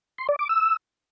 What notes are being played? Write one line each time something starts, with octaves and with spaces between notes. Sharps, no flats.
C6
D5
D6
E6